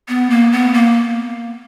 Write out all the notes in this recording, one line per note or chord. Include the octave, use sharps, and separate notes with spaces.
B3
A#3
B3
A#3